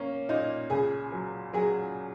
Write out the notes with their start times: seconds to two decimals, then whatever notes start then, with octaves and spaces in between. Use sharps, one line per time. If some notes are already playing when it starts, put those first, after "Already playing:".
Already playing: A#3 C#4
0.29 A#2 D#4
0.70 C#2 G#4
1.12 F#3
1.53 F#3 G#4